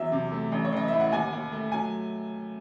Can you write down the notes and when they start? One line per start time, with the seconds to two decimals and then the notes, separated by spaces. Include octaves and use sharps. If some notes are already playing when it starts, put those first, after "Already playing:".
Already playing: E2 F#3 E5
0.12 C3
0.32 A3
0.52 A1
0.64 C#5
0.73 A1 D#5
0.88 A2 E5
1.00 F#5
1.12 D#2 G#5
1.33 D#2
1.52 A3
1.72 F#3 G#5